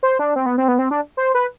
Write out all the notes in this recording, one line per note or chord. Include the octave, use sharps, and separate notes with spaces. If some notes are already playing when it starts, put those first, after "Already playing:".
C5
D4
C4
B3
C4
B3
C4
D4
C5
B4